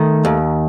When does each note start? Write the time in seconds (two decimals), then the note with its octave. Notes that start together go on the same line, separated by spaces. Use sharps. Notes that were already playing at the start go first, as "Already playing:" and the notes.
Already playing: D#3 A3
0.25 D#2